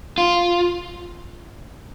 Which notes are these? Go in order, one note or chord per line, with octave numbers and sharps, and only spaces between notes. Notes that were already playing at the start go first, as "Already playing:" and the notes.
F4